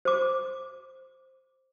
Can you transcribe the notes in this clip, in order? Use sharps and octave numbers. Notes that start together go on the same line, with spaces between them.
C5 D6